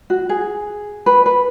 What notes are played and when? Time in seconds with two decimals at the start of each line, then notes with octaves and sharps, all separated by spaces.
0.10 F#4
0.29 G#4
1.06 B4
1.26 B4